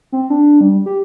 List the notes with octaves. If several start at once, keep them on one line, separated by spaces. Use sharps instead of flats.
C4
D4
G3
G4